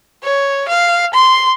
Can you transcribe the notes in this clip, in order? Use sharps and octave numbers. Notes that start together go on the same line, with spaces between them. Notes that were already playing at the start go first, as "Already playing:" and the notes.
C#5
F5
C6